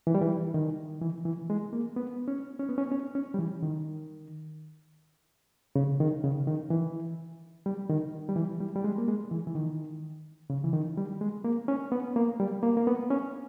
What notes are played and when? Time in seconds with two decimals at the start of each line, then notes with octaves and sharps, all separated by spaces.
0.07 E3
0.15 G3
0.22 E3
0.54 D#3
1.02 E3
1.25 E3
1.50 G#3
1.73 A#3
1.96 B3
2.28 C#4
2.59 C#4
2.69 B3
2.78 C#4
2.91 C#4
3.15 C#4
3.34 G3
3.39 E3
3.63 D#3
5.76 C#3
6.00 D#3
6.24 C#3
6.47 D#3
6.70 E3
7.66 G3
7.90 D#3
8.29 G3
8.36 E3
8.60 G3
8.76 G3
8.84 G#3
8.98 A#3
9.08 G#3
9.31 E3
9.47 E3
9.55 D#3
10.50 C#3
10.64 E3
10.73 D#3
10.97 G3
11.21 G#3
11.44 A#3
11.68 C#4
11.92 B3
12.16 A#3
12.40 G3
12.63 A#3
12.77 A#3
12.87 B3
13.10 C#4